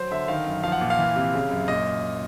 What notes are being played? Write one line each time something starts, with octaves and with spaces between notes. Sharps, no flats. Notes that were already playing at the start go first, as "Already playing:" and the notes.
Already playing: F#3 C5
D3 E5
D#3 F5
F#2
F3 F5
F#5
A#2
F5
E3
C3
C#3
F#2
A#2 D#5